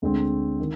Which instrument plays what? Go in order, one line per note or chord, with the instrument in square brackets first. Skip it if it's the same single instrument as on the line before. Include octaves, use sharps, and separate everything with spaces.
[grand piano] D2 D3 G#3 C4
D#3